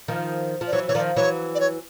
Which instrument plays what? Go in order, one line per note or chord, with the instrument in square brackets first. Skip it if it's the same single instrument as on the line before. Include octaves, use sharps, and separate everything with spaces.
[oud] D#3 F3
F3
[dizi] D5
[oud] E3 F#3 [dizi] C#5
[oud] E3 [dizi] C#5
[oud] D#3 F3 [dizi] D5
[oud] E3 F#3 [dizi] C#5
[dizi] D5
C#5